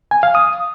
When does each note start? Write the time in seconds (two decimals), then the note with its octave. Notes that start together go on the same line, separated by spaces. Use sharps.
0.11 G#5
0.23 F5
0.35 D#6